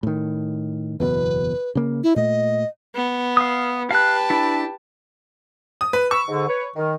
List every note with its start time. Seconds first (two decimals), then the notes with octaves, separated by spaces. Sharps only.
0.03 A2 D#3
1.00 F#1 E2 B2 B4
1.75 C#3 A#3
2.03 E4
2.16 A#2 A3 D#5
2.95 B3
3.37 F5 D#6
3.91 G4 B4 F5 A5 F#6
4.30 D4 E4
5.81 D#6
5.93 B4
6.11 B5 C#6 E6
6.28 G#2 D3
6.48 B4 C#5
6.76 D#3